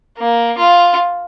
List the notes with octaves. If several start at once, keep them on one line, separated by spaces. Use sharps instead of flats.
A#3
F4